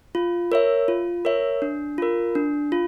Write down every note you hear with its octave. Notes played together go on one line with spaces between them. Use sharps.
F4
A#4 C#5 E5
F4
A#4 C#5 E5
D4
F4 A#4
D4
F4